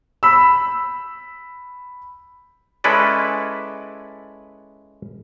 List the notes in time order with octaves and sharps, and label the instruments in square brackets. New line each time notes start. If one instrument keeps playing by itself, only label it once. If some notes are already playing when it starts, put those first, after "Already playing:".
[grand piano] B5 E6
[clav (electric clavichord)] G#3 C#4 E4 A4 B4 D5